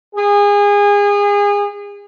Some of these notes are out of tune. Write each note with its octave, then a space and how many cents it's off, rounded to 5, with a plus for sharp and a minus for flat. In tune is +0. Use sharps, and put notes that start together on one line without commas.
G#4 -30